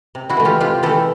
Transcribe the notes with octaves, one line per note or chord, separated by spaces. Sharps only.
C3
E4 F#4
E3 A3
F4 G4
C3 F4 G4
E3 A3 G4 A4